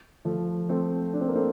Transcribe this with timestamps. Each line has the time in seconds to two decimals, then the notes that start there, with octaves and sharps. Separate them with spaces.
0.25 F3 A3
0.69 A3 C4
1.13 D4
1.21 C4
1.28 A#3
1.35 A3 C4